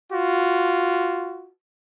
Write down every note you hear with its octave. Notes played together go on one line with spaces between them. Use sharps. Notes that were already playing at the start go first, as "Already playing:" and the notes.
F4 F#4